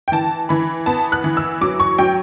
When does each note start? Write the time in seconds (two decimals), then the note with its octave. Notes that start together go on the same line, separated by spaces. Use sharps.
0.08 G5
0.12 E3 A5
0.49 E3 B5
0.86 B3 A5
1.12 F#6
1.24 E3
1.37 E6
1.61 F#3 D6
1.80 C#6
1.98 F#3 G5